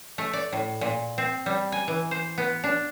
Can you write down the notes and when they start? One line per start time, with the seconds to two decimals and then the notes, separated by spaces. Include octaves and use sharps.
0.18 A3
0.33 D5
0.53 A2
0.81 A#2
1.18 C4
1.46 G3
1.72 G#5
1.88 E3
2.11 C5
2.38 B3
2.64 D4